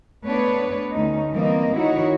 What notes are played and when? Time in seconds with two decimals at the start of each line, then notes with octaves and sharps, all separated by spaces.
0.24 A3 B3 D4 B4 C#5
0.92 D2 C#4 D#4
1.31 E3 G3 A#3 C4 D#5
1.77 D#3 D#4 E4 F#4 C#5